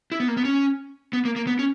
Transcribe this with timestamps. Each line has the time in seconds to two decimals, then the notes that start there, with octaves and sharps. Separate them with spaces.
0.12 E4
0.20 B3
0.28 A#3
0.37 B3
0.45 C#4
1.13 B3
1.25 A#3
1.36 A#3
1.47 B3
1.59 C#4